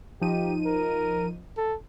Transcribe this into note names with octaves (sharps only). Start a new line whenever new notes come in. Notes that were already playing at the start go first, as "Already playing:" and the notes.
F3 D#4 G4 D#7
A#4
A4